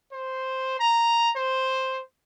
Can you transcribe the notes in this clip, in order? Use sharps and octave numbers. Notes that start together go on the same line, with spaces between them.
C5
A#5
C5